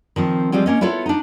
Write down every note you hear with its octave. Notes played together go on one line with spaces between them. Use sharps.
D#3 F3 C4
F3 G3 G#3 C4 F4
A#3 C#4 D#5
B3 E4 F4 A4 C#5
D4 D#4